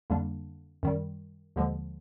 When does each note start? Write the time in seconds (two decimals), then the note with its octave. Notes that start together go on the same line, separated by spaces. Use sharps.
0.10 F2 D3 G3 A#3 D4
0.83 F#2 D#3 G3
1.56 D#2 D3 F3 G#3